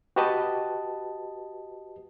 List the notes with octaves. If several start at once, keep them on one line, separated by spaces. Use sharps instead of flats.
F#4 G4 B4 D#5 A5